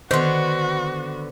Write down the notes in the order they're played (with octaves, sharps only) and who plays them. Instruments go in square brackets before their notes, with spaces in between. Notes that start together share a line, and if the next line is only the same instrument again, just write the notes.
[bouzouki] D3 B3 [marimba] D#3 C6 [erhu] F#4 [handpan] C5